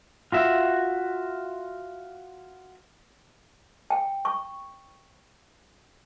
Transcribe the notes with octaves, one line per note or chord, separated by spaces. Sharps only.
F4 F#4 E5
G5
C#6